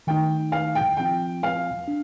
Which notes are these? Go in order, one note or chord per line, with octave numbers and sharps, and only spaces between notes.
D#3 A3 D#4 G5
F5
G5
F3 C4 F4 G5
F5
D4